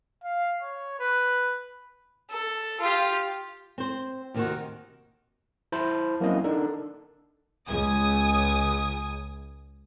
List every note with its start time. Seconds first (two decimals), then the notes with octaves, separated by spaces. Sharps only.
0.24 F5
0.62 C#5
1.00 B4
2.30 A4
2.80 F4 G4
3.78 C4 C5
4.34 D#2 C3 D#3 C4 D#4 F#4
5.72 E4 C5 A5 B5
6.20 F#3 A#3 C4 C#4 E4 D#5
6.44 D4 D#4 A4 A#4
7.67 C#2 G#5 D#6